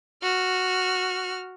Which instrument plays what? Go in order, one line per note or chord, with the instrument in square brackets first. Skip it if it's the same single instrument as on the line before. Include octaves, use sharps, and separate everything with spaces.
[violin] F#4 F6